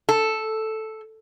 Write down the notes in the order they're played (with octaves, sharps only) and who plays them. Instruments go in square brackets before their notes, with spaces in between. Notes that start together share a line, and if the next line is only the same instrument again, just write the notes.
[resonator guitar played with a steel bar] A4